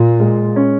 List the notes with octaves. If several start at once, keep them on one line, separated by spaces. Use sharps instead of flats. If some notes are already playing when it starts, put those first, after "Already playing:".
Already playing: A#2 F4
G#3
C#4